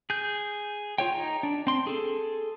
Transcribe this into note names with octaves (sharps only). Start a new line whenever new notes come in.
G#4 G6
F4 C#5 G5
D#4
D4
C4 C6
G#4 A4